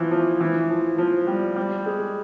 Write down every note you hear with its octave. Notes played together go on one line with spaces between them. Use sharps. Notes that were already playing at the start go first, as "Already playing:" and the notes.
Already playing: E3 F3
F3
E3
F3
F3
G3
G3
G#3